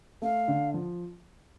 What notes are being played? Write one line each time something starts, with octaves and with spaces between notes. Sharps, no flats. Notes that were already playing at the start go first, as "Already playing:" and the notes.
A3 F5
D3
F3